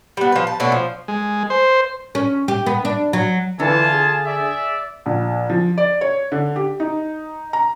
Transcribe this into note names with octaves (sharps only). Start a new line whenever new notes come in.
G3 B3
F3 B4
A5
B2 A3 C#4 D4
F3
G#3
C5
C#4
G4
B3
D4
F#3
D3 E3 F4 G#5 A5
G#4
D5 E5
A#1
F3
D5
C#5
D3
G4
D#4
A#5